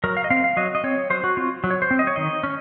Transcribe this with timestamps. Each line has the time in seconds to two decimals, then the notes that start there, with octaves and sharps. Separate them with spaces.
0.04 F#3 A#4
0.17 F5
0.24 D#5
0.30 C4 F5
0.44 F5
0.57 F#3 D#5
0.75 D#5
0.84 C4 C#5
1.10 F#3 C5
1.24 F#4
1.37 C4 F4
1.64 F#3
1.70 C#5
1.82 C5
1.91 C4
1.99 D#5
2.07 C#5
2.16 D#3 D#5
2.43 C#4